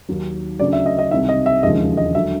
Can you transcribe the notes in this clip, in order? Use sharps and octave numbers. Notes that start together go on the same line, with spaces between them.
D#2 D#3 F#3
D2 C#3 F#3 D5
E5
D#5
D#5
C2 C3 D#3 E5
D#5
E5
E1 D#2 C#3 F3 G#3 D#5
D#5
D3 F#3 E5